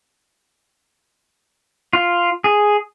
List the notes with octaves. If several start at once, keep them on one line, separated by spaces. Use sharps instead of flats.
F4
G#4